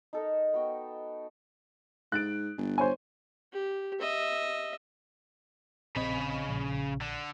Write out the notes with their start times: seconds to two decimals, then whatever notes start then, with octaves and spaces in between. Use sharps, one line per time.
0.13 D#4 A4 A#4
0.54 B3 F#4 G5
2.12 G#2 F#6 A6 D7
2.57 G1
2.78 C5 C#5 G#5
3.53 G4
4.00 D#5 E5
5.96 A#1 C#3 C4 D#5 B5
6.48 A#1
7.01 D3